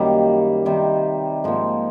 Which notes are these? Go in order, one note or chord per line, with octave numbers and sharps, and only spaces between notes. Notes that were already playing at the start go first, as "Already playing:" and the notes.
Already playing: F#2 D#3 G3 A#3
C3 D#3 G3
G#2 F3 A#3